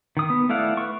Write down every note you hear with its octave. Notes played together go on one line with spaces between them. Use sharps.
D#3 D#6
B3
A3 E4 D5 F5 F#5
B4 C#6